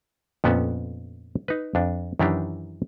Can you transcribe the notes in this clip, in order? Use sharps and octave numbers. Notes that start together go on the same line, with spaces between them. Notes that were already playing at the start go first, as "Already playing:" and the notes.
F2 A#2 B3 C#4 A4 F#5
D#4 B4
F2 D4
F#2 D#3 E3 D4 G4